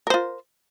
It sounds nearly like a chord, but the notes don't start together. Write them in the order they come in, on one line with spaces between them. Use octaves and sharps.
A#4 C5 F4